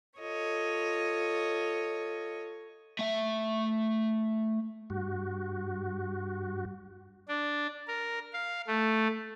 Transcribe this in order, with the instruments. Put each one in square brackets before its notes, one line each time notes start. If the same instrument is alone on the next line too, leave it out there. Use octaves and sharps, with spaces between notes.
[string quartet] F4 A4 C#5 D#5
[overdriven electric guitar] A3 E5
[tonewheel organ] G2 F#4
[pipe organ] D4
A#4
F5
A3